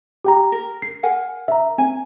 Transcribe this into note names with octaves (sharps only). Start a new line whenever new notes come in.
G4 G5 A#5
A#4
C7
A#4 F#5 G#5
E5 A#5
C4 G#5